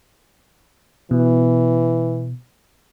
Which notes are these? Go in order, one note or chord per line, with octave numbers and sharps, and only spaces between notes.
B2 E3